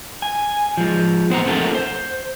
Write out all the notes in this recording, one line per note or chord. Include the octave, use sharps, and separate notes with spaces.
G#5
F3 G#3
B3 C5 F#5 A#5
A3 C4 F4 A4 A#4 F#5
C5